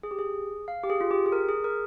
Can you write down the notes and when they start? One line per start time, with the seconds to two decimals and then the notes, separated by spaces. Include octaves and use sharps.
0.03 G#4
0.11 G4
0.19 G#4
0.68 F5
0.83 G4
0.90 G#4
1.01 F4
1.11 G4
1.26 G#4
1.32 A#4
1.49 G#4
1.64 A#4